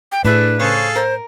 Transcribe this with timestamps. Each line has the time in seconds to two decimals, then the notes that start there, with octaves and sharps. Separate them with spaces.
0.12 G5
0.25 A2 A3 D4 E4 G#4 B4
0.59 C#3 G#4 A4 C5 C#5 F5
0.96 A#4 C5